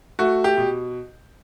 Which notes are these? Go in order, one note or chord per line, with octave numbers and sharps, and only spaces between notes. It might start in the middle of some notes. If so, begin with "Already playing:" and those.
A3 F#4
G4
B2